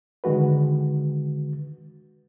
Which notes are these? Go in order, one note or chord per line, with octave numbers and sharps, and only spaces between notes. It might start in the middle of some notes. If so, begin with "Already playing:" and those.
D3 D#3 G#3 F#4 B4